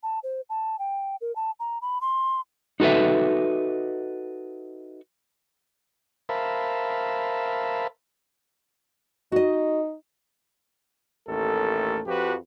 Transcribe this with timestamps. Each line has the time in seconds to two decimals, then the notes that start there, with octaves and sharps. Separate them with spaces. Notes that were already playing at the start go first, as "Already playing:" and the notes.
0.03 A5
0.23 C5
0.50 A5
0.79 G5
1.21 A#4
1.36 A5
1.60 A#5
1.82 B5
2.01 C6
2.80 D#4 F#4 A4 B4 E5
6.29 A#4 C5 E5 F5 A5 B5
9.32 D#4 F#4 D#5
11.28 A1 D#2 A3 A4 A#4
12.06 F2 F3 F#4 G4 B4